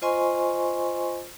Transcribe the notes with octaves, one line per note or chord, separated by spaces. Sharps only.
F4 C5 D#5 G#5 C6 C#6